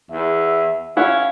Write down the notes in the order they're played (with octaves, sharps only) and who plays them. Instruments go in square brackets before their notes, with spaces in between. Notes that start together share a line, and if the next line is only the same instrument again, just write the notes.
[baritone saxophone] E2 [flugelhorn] E5
[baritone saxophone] C#4 [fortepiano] E4 F#5 [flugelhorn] F5